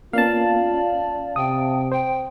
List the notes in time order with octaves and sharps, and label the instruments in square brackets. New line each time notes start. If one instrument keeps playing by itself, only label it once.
[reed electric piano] A#3 B3 C#4 [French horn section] F4 [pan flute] D5 [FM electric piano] F5 A5
[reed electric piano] C#4
[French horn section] C3 [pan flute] G5 [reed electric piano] D#6
[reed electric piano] C5 [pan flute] G5